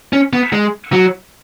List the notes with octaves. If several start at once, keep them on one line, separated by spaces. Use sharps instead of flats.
C#4
B3
G#3
F#3